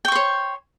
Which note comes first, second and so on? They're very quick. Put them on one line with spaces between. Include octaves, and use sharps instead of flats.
G5 C#6 C5 C#5